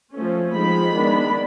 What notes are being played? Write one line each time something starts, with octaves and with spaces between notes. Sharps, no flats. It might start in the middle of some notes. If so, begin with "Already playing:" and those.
F3 A3 C#4
F3 G#3 C4 D#4 B5
D#3 G#3 B3 D4